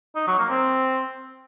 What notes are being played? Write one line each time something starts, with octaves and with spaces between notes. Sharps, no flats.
D#4
F#3
A#3
C4